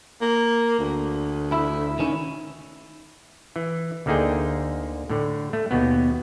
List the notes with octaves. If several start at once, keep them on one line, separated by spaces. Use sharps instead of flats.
A#3
D2
E4
D#3 C#4
E3
D2 D3 A#3 D#4 G#4 G5
A2 D3
A3
D#2 B2 B3